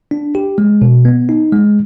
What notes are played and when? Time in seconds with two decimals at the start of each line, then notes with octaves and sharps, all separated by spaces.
0.11 D4
0.35 G4
0.58 G#3
0.82 B2
1.05 B3
1.29 D#4
1.52 G#3